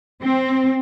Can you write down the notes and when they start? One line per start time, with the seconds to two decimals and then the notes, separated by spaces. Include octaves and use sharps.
0.23 C4